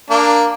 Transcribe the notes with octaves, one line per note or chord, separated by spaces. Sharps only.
A#3 D4